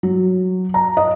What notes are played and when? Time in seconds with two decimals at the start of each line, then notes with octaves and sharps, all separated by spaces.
0.03 F#3
0.74 A#5
0.97 D#5